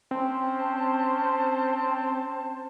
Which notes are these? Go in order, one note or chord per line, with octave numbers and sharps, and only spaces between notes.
C4 C#4 C5 A5